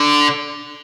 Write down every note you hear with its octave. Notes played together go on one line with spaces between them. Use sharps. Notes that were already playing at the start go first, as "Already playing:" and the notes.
Already playing: D3